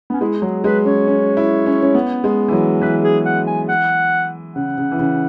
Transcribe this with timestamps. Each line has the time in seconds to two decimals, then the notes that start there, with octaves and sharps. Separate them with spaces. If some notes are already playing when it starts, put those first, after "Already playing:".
0.10 B3 C#4
0.21 G#3 E4
0.42 F#3 G#4
0.64 G#3 B4
0.85 C#4 C#5
1.07 C#4
1.37 E4
1.66 C#4
1.83 C#4
1.95 B3
2.24 G#3
2.48 E3
2.52 F#3
2.82 E3 B4
3.03 G#4
3.25 F#5
3.47 G#5
3.68 F#5
4.55 C#3 F#5
4.78 C#3
4.91 E3
4.99 C#3